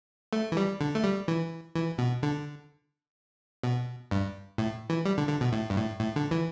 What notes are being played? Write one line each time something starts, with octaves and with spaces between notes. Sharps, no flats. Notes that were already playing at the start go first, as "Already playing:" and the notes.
A3
E3
G3
D3
A3
G3
E3
E3
B2
D3
B2
G2
A2
E3
G3
D3
D3
B2
A2
G2
A2
A2
D3
E3